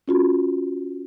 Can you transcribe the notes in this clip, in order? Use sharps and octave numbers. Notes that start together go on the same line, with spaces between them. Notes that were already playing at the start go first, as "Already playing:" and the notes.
C#4 F4 F#4